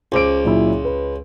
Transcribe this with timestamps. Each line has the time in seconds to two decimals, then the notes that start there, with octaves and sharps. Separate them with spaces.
0.12 C#2 C5 D6 D7
0.45 A#2 F#3 E4
0.85 B4